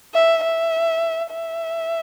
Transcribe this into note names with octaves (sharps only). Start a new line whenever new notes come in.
E5
E5
E5